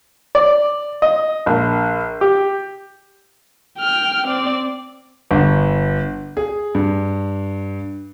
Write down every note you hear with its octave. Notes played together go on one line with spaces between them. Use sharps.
D5
D#5
A#1
G4
G5 F6
C4 D5
G1
G#4
G2